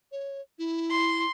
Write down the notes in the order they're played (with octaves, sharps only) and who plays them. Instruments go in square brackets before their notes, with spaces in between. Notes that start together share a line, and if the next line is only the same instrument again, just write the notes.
[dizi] C#5
E4
[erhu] C6